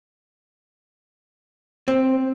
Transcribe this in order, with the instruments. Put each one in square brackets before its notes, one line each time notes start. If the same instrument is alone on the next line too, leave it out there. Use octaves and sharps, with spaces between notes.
[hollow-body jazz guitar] C4